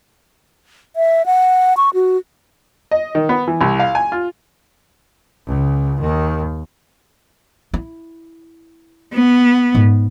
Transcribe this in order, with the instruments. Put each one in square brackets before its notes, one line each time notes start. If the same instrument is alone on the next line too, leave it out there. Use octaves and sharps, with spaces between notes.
[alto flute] E5
F#5
C#6
F#4
[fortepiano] D#5
D#3
B3
E3
C2
F5
G#5
F4
[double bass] C#2 C#3
D#2 D#3
[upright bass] E4
[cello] B3
[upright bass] G#2